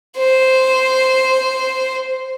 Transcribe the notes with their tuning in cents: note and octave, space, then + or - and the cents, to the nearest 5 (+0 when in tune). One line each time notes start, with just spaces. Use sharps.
C5 -5